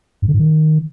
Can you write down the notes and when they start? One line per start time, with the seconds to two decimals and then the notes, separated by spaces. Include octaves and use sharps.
0.22 G2
0.28 D3
0.34 G#2
0.39 D#3